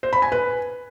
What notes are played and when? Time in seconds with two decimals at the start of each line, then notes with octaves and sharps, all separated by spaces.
0.03 C5
0.13 B5
0.22 G#5
0.32 B4